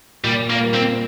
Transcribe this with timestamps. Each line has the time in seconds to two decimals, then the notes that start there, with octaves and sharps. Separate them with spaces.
0.24 A#2 G3
0.50 A#3
0.61 G3 A#3
0.74 C4